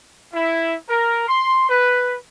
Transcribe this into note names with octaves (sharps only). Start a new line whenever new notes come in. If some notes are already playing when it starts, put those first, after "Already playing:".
E4
A#4
C6
B4